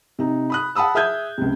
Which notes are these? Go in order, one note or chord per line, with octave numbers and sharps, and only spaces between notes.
C3 D#4
B5 D#6 F#6
F#5 A5 B5 D#6 E6
G#4 E5 D#6 F6 G6 G#6
C#2 C3